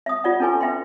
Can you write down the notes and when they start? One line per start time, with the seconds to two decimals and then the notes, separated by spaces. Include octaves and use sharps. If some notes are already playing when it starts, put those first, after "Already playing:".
0.06 E5 D#6
0.24 F4 D5 F#5
0.40 C#4 E4 A4 B4 G#5 C#6
0.61 B4 E5 G5 C6